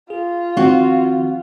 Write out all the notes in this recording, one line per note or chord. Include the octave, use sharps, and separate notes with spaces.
F4 G#4
D#3 F3 C4 F#4